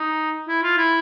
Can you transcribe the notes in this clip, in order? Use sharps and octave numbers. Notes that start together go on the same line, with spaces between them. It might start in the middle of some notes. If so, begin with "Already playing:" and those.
Already playing: D#4
E4
F4
E4